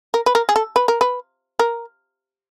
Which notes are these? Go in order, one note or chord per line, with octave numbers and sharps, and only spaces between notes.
A#4
B4
A#4
G#4
A4
B4
A#4
B4
A#4